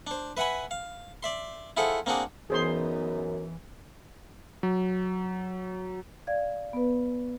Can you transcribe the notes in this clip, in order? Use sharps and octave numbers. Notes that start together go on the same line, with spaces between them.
D4 C5
B4 E5 F#5 G#5 B5
F5
D5 E5 C6
E4 F4 G#4 A4 C5 F#5
A#3 C4 D4 F#4 G#4
F#2 E3 B3 D#4 G#4 C5 C6
F#3
D5 F5 G#6
B3 B4